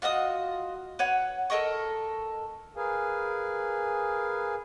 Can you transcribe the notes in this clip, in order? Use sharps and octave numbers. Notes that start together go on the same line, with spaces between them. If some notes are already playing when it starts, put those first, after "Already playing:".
F4 F#4 D#5 D#6
B4 C#5 F#5
A4 A#4 D#5 C#6
G#4 A#4 B4 F5 G#5